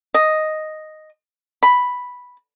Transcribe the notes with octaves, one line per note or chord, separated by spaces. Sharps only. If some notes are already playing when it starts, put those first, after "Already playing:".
D#5
B5